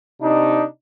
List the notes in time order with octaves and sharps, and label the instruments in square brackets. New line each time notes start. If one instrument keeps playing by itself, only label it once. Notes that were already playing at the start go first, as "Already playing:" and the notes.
[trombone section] C3 D4 D#4